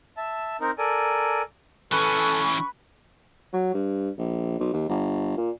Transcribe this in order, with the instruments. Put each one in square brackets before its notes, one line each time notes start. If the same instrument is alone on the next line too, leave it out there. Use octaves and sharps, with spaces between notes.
[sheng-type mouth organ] E5 A5
C4 D#4 A#4
A4 A#4 D5 G#5
[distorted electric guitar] E3 C#4 [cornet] A4 [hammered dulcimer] B4 [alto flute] C#6
[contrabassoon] F#3
G2
A#1
B1
D#2
G1
A#2